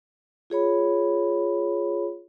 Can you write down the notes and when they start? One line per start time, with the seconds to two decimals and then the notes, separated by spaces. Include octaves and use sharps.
0.50 F4 G#4 C#5 B5